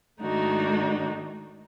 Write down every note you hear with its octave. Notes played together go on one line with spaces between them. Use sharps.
G#2 D#3 A3 D4 D#4 F#4